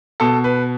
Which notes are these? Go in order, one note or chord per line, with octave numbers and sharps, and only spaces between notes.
B2 A4
B4